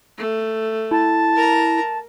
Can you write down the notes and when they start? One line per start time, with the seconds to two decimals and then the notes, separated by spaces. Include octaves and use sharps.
0.18 A3
0.91 E4 A5
1.35 A#4 A#5